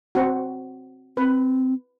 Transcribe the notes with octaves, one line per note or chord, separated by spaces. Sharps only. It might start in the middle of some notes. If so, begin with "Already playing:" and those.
C4 F#4
C4 B4